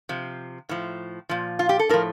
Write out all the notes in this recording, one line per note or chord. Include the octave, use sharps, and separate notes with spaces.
C3 F3
A2 F3
A#2 F3
F4
G4
A4
A2 F3 A#4